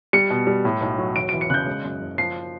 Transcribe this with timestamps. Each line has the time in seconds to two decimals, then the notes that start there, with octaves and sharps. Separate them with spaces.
0.13 G3 C#7
0.30 B2
0.47 G3
0.65 A2
0.81 B1
0.98 F#3
1.16 E1 D7
1.29 E3 D7
1.41 C#7
1.50 C#3 F#6
1.54 G6
1.67 G#3
1.84 F#2
2.01 F#1
2.18 F3 C7